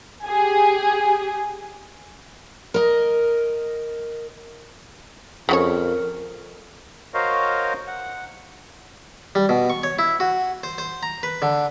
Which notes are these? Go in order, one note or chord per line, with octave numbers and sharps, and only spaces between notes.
G4 G#4 G#5
A#4 D#5
F2 C#3 F#4 A#4 C#5
F#4 A#4 C5 C#5 D#5 F5
F#5
G3
B2
C#6
C#5
E4
F#4
C5
C5
A#5
B4
D3